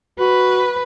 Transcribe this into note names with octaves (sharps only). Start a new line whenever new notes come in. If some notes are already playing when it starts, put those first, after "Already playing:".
F#4 B4